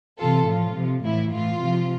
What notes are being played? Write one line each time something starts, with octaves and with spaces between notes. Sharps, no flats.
C3 E3 F4 A4
A2 F3 F4
C3 F3
A2 E3 E4
A2 E3 F4
C3 F3